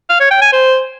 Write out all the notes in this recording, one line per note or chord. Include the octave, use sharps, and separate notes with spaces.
F5
C#5
G5
G#5
C5